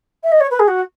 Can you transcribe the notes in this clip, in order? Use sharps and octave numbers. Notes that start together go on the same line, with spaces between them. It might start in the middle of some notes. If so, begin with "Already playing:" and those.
E5
D#5
C#5
B4
G#4
F#4